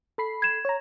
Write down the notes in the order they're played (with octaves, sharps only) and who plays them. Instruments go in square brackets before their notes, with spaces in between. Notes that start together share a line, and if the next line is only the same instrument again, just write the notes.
[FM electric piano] A4 B5 C7
[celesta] G#6 E7
[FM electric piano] C#5 A#5